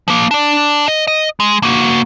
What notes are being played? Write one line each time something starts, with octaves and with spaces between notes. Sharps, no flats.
F3 A#3
D4 D5
D#5
D#5
G#3
A#3 F#4